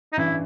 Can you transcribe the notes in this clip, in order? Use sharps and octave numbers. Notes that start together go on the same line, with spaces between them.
D#4
A1 G2 E3 E4